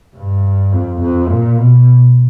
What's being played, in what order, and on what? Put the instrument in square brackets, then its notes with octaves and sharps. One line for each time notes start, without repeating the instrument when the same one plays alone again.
[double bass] G2
F2
F2
A#2
B2